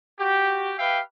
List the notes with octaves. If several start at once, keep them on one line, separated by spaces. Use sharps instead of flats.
F#4 G4
G4 B4 E5 F5 G5